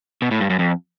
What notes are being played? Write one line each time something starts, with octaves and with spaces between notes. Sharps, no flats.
B2
A2
G2
F#2
F2